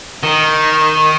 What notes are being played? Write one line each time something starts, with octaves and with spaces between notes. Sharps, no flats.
D#3